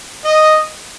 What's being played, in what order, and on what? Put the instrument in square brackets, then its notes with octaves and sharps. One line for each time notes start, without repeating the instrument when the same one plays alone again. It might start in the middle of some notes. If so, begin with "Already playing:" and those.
[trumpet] D#5